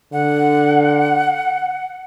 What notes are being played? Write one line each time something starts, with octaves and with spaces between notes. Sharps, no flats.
D3 F#5